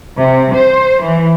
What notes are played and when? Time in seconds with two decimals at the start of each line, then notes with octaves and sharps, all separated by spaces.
0.19 C3
0.53 C5
1.02 E3